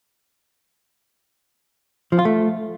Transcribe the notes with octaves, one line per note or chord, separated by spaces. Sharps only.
F3
F4
A3